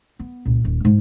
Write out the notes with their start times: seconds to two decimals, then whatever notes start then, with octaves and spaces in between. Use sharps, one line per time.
0.19 B3
0.46 C#2 A#2
0.65 D#1
0.85 G#2 D#4